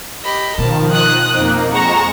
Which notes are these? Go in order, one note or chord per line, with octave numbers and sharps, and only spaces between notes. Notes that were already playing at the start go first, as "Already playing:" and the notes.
G4 D#5 B5
B2 D#3 F3 A#4 A5
D#6 F#6
F2 A#3 C4 D#4
F2 G#3 F#5 A#5 C#6 E7